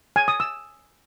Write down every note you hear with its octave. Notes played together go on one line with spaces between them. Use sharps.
G#5
D#6
E6